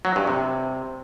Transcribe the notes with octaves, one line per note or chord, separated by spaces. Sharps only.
F#3
G2
C3